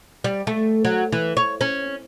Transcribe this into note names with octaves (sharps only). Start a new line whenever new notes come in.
G3
A3
F#3
E3
C#5
C#4